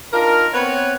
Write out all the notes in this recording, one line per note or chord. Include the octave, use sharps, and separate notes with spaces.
D4 D#4 F4 A#4
B3 C4 B4 C#5